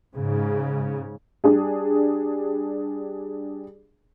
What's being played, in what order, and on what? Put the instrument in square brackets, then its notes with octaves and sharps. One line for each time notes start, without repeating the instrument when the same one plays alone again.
[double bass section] G#2 C#3
[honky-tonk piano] G3 D4 G#4